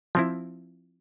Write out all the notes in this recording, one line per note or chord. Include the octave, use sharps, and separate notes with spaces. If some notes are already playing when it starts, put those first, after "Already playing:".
F3 C4 E4